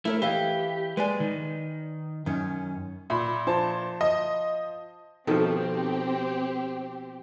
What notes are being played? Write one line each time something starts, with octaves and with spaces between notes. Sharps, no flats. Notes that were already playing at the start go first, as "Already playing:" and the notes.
A3 E4 A#4 C#5
E3 G4 D#5 F5
G#3 B4 D5 G#5
D#3
F#2 D#3 C#4
A#2 E5 B5
F3 C5 A5
D#5
B2 D#3 F3 C4 G4 A4